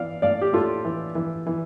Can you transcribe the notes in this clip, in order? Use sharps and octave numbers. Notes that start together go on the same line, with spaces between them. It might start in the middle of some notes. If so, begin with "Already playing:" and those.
Already playing: E3 D5 F5
A2 D5 F5
G4
A2 F4 A4
E3
E3
E3